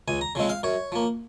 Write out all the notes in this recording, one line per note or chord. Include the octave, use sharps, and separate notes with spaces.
C#2 G#5
A#5
C#3 F3 G#3 C4
F5
F#2 C#5
F3 A#3